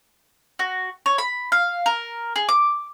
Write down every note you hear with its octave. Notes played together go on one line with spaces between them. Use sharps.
F#4
C#5
B5
F5
A#4
G#4
D6